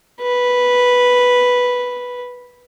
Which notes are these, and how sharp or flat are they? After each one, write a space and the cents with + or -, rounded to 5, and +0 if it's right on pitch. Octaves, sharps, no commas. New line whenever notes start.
B4 -5